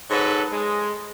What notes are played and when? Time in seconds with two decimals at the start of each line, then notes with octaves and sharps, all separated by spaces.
0.10 G#2 F#3 A4 B4
0.51 G#3